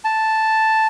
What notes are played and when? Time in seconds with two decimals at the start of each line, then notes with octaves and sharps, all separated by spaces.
0.04 A5